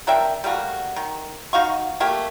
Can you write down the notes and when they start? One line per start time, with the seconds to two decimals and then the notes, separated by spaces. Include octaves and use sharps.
0.07 D4 A#4 E5 G5
0.44 G3 A3 A#3 F#4
0.96 D#3
1.53 D#4 F#4 F5 C#6
2.00 A3 A#3 G4